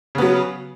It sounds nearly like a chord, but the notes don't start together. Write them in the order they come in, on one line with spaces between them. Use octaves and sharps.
C#3 B3 F#3